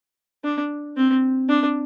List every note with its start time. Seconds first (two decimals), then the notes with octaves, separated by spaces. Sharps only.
0.44 D4
0.97 C4
1.49 D4